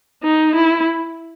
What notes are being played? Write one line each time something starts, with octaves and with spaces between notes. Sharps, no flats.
D#4
E4